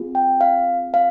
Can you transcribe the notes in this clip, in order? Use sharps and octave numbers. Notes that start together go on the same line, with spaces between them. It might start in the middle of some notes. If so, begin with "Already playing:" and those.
Already playing: C4 F4 G#4
G5
F5
F5